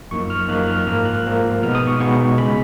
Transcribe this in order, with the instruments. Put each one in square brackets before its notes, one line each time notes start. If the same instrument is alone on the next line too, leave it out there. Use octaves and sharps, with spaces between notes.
[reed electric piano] F#2 F3 A#3 D#4 C#6
F6
F#2 F3 A#3 D#4 F#6
F6
G#2 F3 A#3 F6
F#6
G#2 F3 A#3
B2 G#3 B3 D#4 F6
D#6
C#6
B2 G#3 B3 D#4 C#6
C#3 G#3 B5